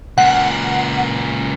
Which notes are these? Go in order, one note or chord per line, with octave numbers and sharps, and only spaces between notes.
C#2 A#2 F#5